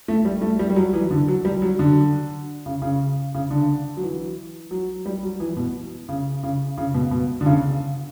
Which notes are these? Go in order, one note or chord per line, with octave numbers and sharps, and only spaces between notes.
A3
G3
A3
G3
G3
F#3
E3
D3
F#3
G3
F#3
D3
C#3
C#3
C#3
D3
F#3
E3
F#3
G3
F#3
E3
B2
C#3
C#3
C#3
B2
B2
D3
C#3